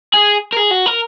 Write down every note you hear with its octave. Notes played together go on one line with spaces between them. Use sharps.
G#4
A#4
G#4
F#4
A#4